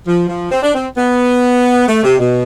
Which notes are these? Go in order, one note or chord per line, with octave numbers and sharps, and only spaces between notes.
F3
F3
C4
D4
C4
B3
A3
C3
B2